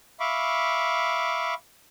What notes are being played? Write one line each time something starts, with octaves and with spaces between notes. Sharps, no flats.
E5 F5 B5 C#6 D6